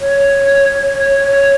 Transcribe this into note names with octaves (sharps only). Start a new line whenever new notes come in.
C#5
C#5